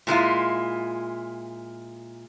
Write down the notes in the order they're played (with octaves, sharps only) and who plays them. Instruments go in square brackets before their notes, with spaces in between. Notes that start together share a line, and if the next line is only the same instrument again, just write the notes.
[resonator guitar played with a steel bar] A#2 G#3 E4 F4